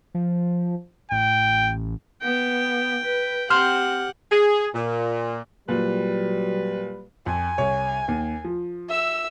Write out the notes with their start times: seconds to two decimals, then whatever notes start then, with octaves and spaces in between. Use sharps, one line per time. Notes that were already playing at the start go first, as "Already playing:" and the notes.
0.14 F3
1.11 A1 G5
2.22 B3 G5
3.05 B4
3.50 C4 G4 C5 F#5 F6
4.31 G#4
4.74 A#2
5.69 A#2 F#3 G3 B4
7.26 F2 G#5
7.58 C2 C#5
8.08 D#2
8.44 F3
8.89 E5 E6